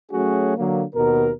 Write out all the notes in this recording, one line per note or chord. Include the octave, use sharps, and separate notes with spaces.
F#3 A3 C#4 F#4 G#4
D3 F#3 A#3
D#2 B2 A#4